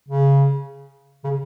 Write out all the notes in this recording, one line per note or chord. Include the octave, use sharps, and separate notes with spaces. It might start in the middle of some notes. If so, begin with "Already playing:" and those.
C#3
C#3